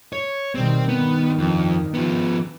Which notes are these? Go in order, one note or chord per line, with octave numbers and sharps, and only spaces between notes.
C#5
B2 D#3 G3 C4
G2 D#3 B3
F2
F3 B3